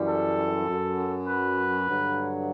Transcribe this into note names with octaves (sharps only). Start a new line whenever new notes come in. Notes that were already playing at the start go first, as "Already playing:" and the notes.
Already playing: F#2 E3 G3
A4
F#2 F#3
B4
G2 D3 F#3